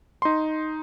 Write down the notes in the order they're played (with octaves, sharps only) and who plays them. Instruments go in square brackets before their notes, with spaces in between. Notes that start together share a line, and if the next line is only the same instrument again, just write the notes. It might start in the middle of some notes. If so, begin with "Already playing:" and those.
[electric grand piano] D#4 C6